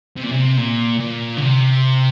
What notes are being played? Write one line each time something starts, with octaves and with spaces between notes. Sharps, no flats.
C3
A#2
C3
A#2
A#2
D3
C3